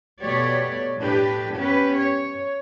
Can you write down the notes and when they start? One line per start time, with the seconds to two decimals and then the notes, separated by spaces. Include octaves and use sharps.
0.21 B2 A3 G4 C#5 D5
0.98 A2 D4 G4 B4
1.55 B3 C#4 G4 B4
1.95 C#5